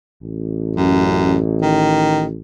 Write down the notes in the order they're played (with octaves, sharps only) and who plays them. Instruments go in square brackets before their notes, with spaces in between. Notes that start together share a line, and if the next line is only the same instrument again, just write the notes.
[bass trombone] A1
[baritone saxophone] F#2
D#3